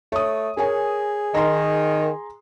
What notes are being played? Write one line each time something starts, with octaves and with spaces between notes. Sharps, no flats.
A3 C#5 D#6
G#4 A#4 C#5 G#5
D#3 A#5 C6